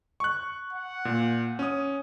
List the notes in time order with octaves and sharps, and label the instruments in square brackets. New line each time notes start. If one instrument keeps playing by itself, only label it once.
[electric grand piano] C#6 F#6
[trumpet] F#5
[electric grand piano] A#2
C#4 D#6